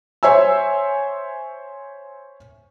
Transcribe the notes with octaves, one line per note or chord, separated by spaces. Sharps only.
C5 C#5 E5 G#5 E6